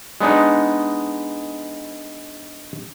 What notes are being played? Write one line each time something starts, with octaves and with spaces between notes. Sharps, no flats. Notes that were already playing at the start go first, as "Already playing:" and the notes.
G#3 B3 D4 D#4